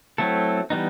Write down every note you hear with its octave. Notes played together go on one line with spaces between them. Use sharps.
F#3 A3 C4 E4 A4
E3 G3 B3 D#4